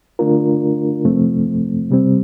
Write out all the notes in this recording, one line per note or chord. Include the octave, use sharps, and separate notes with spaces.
D3 A3 D4 F4 A#4
F2 C3 F3 A3 C4
C3 G3 C4